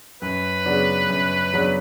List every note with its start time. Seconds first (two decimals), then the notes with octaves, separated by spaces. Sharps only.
0.22 F#2 B4
0.66 C#3 F#3 B3 D4
1.09 F#2
1.53 C#3 F#3 B3 D4